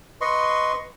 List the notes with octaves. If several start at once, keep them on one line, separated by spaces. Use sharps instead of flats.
B4 D#5 C6 C#6